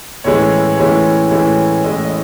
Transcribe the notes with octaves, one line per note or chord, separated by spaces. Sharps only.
A2 E3 G#3 C#4 C#5
A2 E3 G#3 C#4
A2 E3 G#3 C#4
A2 E3 G#3 C#4 D#5
D#5